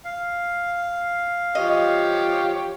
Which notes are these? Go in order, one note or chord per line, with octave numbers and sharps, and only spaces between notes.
F5
F3 G4 C#5 D#5